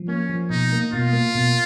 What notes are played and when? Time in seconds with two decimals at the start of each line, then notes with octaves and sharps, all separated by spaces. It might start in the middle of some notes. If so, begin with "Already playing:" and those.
Already playing: F3
0.08 A#3 C#4
0.30 F3
0.50 B2 D#4
0.72 A#3
0.93 B2 F4
1.13 A#3
1.35 B2